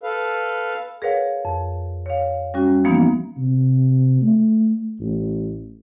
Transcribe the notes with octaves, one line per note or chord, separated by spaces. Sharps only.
A4 B4 F5
G#4 A#4 B4 C#5 F5 F#5
F2
C#5 F5
G3 C#4 F#4
E3 F3 A#3 B3 D#4
C3
A3
A1